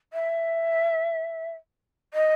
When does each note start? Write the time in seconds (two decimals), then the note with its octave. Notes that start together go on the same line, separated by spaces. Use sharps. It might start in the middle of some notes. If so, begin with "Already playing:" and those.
0.13 E5
2.14 D#5